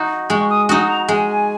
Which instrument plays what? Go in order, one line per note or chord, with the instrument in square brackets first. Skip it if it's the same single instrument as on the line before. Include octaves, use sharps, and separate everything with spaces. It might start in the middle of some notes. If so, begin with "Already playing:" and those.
Already playing: [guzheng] D#4 F#4
[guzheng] G#3 [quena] C#6
[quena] D#6
[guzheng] D#4 F#4 [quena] D#6
[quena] A#5
[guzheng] G#3 [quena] G#5